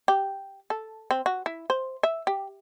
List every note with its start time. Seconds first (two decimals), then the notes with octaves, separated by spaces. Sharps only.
0.08 G4
0.70 A4
1.11 C4
1.26 F#4
1.46 E4
1.70 C5
2.03 E5
2.27 G4